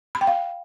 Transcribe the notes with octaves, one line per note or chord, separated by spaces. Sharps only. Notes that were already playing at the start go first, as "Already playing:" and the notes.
B5
G5
F5